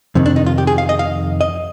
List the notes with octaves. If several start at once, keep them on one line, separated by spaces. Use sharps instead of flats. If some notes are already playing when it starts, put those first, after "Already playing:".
F2 C3 D#3
D4
D#4
F4
G4
G#4
F5
D#5
F5
D#5